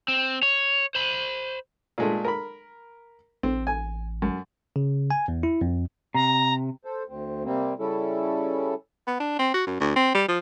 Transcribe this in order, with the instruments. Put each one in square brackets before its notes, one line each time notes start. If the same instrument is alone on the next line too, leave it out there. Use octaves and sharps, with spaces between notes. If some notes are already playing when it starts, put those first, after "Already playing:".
[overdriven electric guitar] C4
C#5
C5 B5
[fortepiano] A#2 G#3 A3
A#4 B5
[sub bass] A1 [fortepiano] C4
[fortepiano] G#5
F#2
[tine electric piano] C#3
G#5
E2
E4
F2
[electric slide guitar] C3 [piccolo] A#5
[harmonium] A4 C5
D2 C4
C3 G3 A#3 C4
C#3 G3 C#4 E4 A4
[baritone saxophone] B3
D4
C4
F#4
F#2
D2
C4
G3
F3